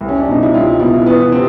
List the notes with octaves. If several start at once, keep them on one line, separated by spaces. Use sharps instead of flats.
C2
C#4
D4
B2 D#4
E4
C2 F4
B2 E4
E3 B3
C3 C4